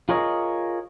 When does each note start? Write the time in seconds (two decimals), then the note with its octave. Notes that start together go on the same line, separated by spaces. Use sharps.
0.09 F4 G#4 A#4 C#5 D#5